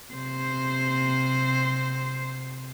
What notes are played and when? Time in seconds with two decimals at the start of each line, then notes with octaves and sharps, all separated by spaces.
0.14 C3 C5